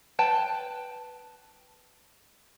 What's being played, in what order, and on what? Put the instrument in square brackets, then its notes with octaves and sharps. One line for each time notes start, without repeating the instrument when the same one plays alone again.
[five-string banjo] B4 G5 A5